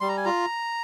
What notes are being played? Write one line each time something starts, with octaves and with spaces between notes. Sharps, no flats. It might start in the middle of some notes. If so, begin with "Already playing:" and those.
G3 C6
A#5
G#5
F4 A#5